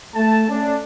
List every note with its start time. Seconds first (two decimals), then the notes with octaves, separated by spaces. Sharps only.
0.14 A3 A5
0.48 A3 C#4 D4